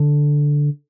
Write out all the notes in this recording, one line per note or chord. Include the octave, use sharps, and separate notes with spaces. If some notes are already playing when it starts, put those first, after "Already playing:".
Already playing: D3